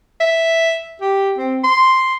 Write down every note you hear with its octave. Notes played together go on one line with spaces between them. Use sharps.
E5
G4
C4
C6